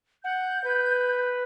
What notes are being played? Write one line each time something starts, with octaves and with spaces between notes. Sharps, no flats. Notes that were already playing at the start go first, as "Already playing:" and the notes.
F#5 G6
B4